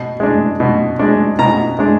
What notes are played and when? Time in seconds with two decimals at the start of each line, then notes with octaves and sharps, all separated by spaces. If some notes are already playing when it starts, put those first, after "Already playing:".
Already playing: B2
0.20 G#3 D4
0.60 B2
0.99 G#3 D4
1.39 B2 A#5
1.79 G#3 D4